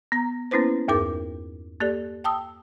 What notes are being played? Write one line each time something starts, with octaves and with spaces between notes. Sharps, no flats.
B3 A#5
A#3 B3 C#4 E4 B4 C5
E2 G2 D#4 G#4 A#4 D6
A#3 G4 A4 D5
G5 A5 D#6 E6